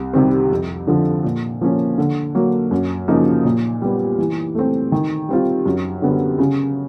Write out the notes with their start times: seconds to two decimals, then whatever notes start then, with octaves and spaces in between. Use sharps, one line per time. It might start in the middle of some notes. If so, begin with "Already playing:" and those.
Already playing: C2
0.14 C3 D#3 G3 C4
0.51 F2
0.87 D3 F3
1.24 A#2
1.61 F3 A#3 C#4
1.98 D3
2.35 F#3 A#3
2.71 F#2
3.08 C#3 F3 A#3 D#4
3.44 A#2
3.82 G3 B3
4.18 E3
4.55 A3 C4
4.92 D#3
5.29 G3 C4 F4
5.66 F#2
6.02 D3 G3 B3
6.39 C#3